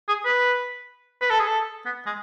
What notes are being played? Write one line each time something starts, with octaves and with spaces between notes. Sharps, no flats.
G#4
B4
B4
A4
G#4
A4
B3
G#3